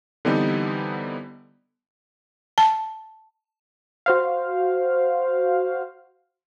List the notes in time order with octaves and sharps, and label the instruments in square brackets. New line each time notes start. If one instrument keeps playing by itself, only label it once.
[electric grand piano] D3 E3 G3 B3 C4 D#4
[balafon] A5
[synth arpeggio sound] F#4 C5 F5